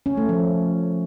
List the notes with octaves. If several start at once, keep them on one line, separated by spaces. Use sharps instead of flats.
C#4
A3
F3